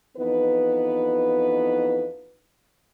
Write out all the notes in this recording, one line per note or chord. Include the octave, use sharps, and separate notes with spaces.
F2 E3 B3 D#4 B4